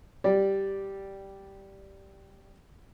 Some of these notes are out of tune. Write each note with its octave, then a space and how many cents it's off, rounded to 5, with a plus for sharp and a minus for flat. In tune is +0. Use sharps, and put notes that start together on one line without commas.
G3 -5 D5 +0